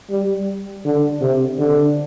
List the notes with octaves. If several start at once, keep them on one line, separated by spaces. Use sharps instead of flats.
G3
D3
C3
D3